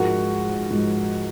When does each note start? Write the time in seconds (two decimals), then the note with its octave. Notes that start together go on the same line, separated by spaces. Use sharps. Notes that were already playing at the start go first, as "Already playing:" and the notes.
Already playing: G#2 F3 G#3 F#4 A#4
0.70 G#2 F3 G#3